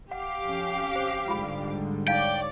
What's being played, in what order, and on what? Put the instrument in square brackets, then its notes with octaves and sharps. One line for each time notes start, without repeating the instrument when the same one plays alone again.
[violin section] G4 F5 D6 [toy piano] F#5
[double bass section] F2 C#4
[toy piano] C5
[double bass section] G#2 D3 G3 [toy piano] F4 B5
[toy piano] D#4 F5 [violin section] C#5 D5 [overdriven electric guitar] G5